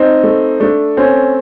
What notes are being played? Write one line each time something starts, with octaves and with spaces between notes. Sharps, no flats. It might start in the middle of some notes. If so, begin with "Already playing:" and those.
Already playing: C4 D#4
A3
A3 D4
C4 C#4